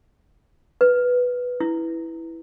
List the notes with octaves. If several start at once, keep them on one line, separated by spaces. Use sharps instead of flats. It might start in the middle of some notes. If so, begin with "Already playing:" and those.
B4
E4